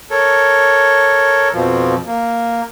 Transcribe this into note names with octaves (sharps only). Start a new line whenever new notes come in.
A4 A#4 C#5
F2 B2 F3
A#3